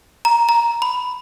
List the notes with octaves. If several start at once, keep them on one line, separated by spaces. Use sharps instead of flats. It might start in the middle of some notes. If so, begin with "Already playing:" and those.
A#5
A#5
B5